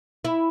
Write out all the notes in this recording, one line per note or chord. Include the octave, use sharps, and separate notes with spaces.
E4